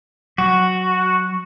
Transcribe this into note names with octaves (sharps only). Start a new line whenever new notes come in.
F#3 F#4